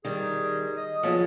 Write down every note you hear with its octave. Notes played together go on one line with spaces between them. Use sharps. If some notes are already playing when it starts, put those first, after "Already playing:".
D#3 G3 G#4
D#5
F3 F#3 B3 G#4